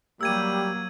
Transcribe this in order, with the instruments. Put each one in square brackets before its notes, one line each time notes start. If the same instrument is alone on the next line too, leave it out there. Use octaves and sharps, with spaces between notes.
[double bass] F#3 A#3 [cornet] G3 [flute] G4 [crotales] E6 G#6 D#7